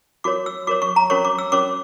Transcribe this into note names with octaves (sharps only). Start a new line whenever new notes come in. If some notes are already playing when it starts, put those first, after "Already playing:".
F#4 A#4 C#5 D6
E6
F#4 A#4 C#5 D6
C#6
A#5
C#4 F#4 A#4 C#5 C#6
D6
E6
C#4 F#4 A#4 C#5 D6